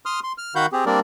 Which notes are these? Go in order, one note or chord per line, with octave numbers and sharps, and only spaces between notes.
C6 D#6 F6
C6
F6
D#3 F#4 F5 F#5 B5 G6
C4 G4 G#4
G3 A#3 C4 D4 A#4 D5